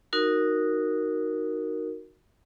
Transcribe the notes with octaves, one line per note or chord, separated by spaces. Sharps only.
D#4 F#4 A#4